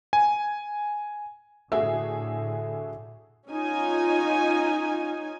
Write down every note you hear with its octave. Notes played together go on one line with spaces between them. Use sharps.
G#5
A2 D3 A3 F#4 G#4 E5
C#4 D#4 F4 G#5